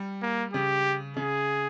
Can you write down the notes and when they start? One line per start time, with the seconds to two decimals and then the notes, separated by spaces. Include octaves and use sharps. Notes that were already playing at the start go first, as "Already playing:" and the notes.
Already playing: G3
0.22 A#3
0.53 C#3 G4
1.17 C#3 G#4